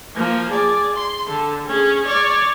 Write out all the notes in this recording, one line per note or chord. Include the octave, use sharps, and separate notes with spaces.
F3 A#3
G#4 D5
C6
D3 A4
C#4 G#4
C#5 D5